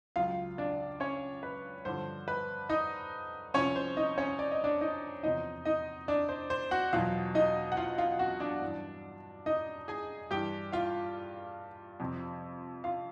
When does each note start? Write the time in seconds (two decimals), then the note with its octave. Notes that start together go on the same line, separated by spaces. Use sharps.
0.16 C#2 C#3 F#3 F4 F5
0.58 D4 D5
1.00 C#4 C#5
1.43 B4
1.85 G2 D3 F3 C5
2.28 B4
2.69 D#4 D#5
3.54 C2 C3 F3 C#4 C#5
3.76 C5
3.97 D#4 D#5
4.18 C#4 C#5
4.39 D5
4.51 D#5
4.64 D4 D5
4.81 D#4 D#5
5.23 E2 C3 F3 D#4 D#5
5.65 D#4 D#5
6.08 D4 D5
6.29 C5
6.50 C5
6.71 F#4 F#5
6.93 E2 B2 F#3 F4 F5
7.35 D#4 D#5
7.72 F#5
7.77 F4 F5
7.98 F4 F5
8.19 F#4 F#5
8.40 D4 D5
8.62 G2 E3
9.46 D#4 D#5
9.88 G#4 G#5
10.31 G2 E3 G4 G5
10.73 F4 F5
12.00 F2 C3 F3
12.84 F4 F5